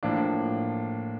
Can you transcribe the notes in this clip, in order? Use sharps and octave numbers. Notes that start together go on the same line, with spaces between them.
A2 F3 A#3 D4